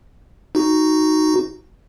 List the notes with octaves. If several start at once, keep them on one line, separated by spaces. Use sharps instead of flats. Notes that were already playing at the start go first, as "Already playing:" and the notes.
D#4 F#4